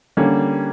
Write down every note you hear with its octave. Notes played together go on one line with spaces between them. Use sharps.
D3 G3 A#3 C#4